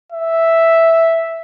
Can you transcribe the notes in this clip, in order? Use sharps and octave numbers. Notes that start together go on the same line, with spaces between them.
E5